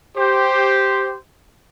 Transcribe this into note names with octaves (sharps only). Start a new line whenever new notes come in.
G4 C5